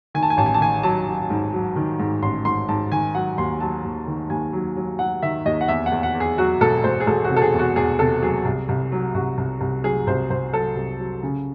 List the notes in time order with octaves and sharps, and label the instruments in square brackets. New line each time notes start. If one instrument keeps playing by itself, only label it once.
[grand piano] D#3 G#5
A5
G#5
A1 A5
G#5
A5
D#3 G#5
F#3 A5
F#3
G#2
F#3
D#3
G#2
A1 C6
G#2 C6
G#2 A5
D#3 G#5
F#3 F#5
D#2 C6
F#3 A5
D#2
D#3
D#2 G#5
F#3
F#3
F#3 F#5
D#3 E5
D#2 D#5
F#5
E2 E5
F#5
E2
F#5
E2
G#4
F#3 F#4
E1 A4
E1 C5
G#4
E1 A4
F#4
C3
A4
G#4
E2
F#4
E2 G#4
C3 A4
F#3 G#4
C2
C2
F#3
C2 F#4
C2
C2
F#3 G#4
C2 C5
C2 C5
F#3 A4
C2
F#3
C#3